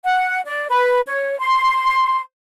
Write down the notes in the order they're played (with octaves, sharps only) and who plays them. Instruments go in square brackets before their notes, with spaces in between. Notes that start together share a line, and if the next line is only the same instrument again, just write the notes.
[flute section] F#5
D5
B4
C#5
C6